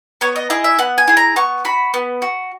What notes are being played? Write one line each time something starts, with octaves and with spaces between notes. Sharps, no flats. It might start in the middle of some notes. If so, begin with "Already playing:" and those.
B3 C#5
D#5
E4 G#4 D#5
E5
B3 F#5
G#5
E4 G#4
A#5
B3 C#6
F#4 B5
B3
F#4